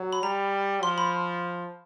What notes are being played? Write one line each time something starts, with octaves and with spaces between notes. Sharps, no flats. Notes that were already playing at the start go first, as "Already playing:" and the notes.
Already playing: F#3
B5
G3 A#5
F3 C6
B5